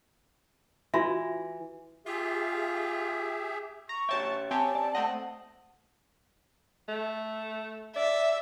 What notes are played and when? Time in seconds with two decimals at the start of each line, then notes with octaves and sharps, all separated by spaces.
0.94 E3 F4 F#4 E5
2.06 F4 G4 G#4 E5
3.89 A#5 C#6
4.09 G4 C#5 E5 G5 A5
4.51 C4 G4 C#5 G#5 A5
4.75 D5
4.95 A3 C4 D#5 F#5
6.88 A3
7.96 D5 E5